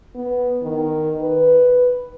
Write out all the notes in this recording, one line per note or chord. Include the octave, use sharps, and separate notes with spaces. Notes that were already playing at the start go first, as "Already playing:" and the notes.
B3
D#3
B4